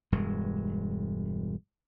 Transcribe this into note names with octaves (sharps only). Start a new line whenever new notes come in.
E1 G2 G#3